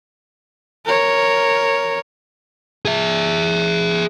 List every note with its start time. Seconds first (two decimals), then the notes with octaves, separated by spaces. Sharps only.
0.85 A#4 C#5
2.85 G#4 E5